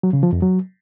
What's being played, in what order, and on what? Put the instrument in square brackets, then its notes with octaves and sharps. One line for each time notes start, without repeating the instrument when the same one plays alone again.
[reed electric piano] F#3
C#3
F3
F2
F#3